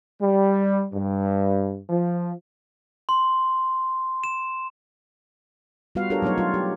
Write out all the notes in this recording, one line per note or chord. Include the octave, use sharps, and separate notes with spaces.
G3
G2
F3
C6
E7
G3 B3 F4 F#4 B4 F5
D4 F4 G4 A4 A#4 C#5
F#3 A3 B3 D#4 C#5
F#3 F4
G4